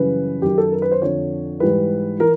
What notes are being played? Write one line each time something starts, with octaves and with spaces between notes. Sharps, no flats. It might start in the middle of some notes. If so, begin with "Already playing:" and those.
Already playing: F#2 C#3 E3 G3 B4
F#2 D#3 F#3 G4
A4
A#4
B4
C5
F2 D3 F3 C#5
G#2 E3 G3 B4
E3 A#4